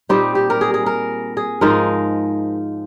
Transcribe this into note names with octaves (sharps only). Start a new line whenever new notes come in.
A#2 G3 C4 D#4 G4
G4
A#4
G#4
G#4
A#4
G#4
G#2 F3 G#3 D#4 A#4